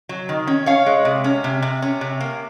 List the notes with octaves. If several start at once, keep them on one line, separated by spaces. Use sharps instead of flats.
F#3
D#3
C#4
C#4 C#5 F5
G#3
C3
C#4
C3
C3
C#4
C3
A#3